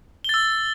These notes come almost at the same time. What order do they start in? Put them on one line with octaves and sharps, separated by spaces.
G7 A6 E6